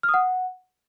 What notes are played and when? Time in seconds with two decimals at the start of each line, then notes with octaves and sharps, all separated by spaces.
0.03 F6
0.09 D#6
0.14 F#5